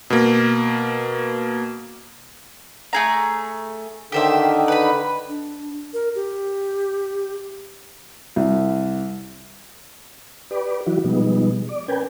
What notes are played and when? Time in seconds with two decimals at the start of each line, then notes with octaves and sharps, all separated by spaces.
0.10 B2 A#3
2.93 A3 G#4 A#5
4.12 D3 D#3 G4 C5 E5
4.68 B4 B5
5.28 D4
5.94 A#4
6.15 G4
8.36 C2
10.51 G4 B4 D5
10.86 E3 F#3 E4 F#4
11.04 B2 F3 G3 G#3 B3 D#4
11.69 D5
11.88 C#4 A#4 B4 G5 G#5